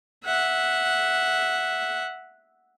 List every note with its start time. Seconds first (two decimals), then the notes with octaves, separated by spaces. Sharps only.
0.25 E5 F#5